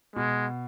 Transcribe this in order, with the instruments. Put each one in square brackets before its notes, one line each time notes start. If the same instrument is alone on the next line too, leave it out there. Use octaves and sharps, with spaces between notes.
[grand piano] B2 [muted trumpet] G#3